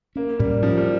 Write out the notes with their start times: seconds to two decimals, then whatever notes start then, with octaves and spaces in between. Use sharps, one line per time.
0.16 A#3 C#4
0.39 A2 G3
0.63 F3 C#4
0.78 G3